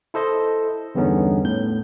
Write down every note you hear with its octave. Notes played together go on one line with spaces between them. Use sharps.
E4 A4 C5 D#5
E2 G2 D3 B3 C#4 D#4
A2 G6